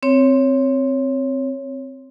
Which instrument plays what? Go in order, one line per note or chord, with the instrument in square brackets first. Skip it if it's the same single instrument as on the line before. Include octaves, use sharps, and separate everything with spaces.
[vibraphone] C4 C#5